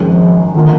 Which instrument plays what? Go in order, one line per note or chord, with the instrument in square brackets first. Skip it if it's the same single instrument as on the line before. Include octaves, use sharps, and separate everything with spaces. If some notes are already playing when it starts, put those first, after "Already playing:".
Already playing: [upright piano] G#1 F#2 D#3 G#3 [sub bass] F3
[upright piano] D3 F3 A#3 [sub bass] D#3